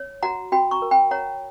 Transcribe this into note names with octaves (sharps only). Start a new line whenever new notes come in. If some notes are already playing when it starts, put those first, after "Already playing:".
Already playing: C#5
F#4 F#5 A#5
F#4 G5 B5
A#5 C#6
A#4
G5 B5
C#5 F#5 A#5